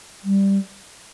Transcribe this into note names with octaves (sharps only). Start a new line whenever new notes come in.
G3